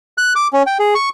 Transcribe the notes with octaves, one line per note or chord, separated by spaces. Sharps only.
F#6
D6
C#4
G5
G#4
C#6